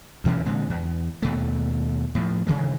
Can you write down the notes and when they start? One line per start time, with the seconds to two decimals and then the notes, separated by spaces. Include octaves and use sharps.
0.24 D2 B2 E3 C#4
0.45 A#2 D3 G#3 C4
0.70 E2
1.22 D#2 B2 A3
2.15 A2 F3
2.47 C3 D#3 E3 G#3